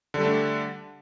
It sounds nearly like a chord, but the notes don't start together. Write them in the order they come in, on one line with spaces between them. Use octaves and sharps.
D3 G3 A3 D4